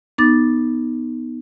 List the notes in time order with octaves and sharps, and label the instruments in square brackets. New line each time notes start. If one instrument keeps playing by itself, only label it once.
[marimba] B3 D#4 D6 A6